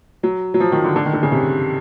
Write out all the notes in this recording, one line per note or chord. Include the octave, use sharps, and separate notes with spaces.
F#3
F#3
F3
D#3
D3
D3
D#3
D3
C#3
C3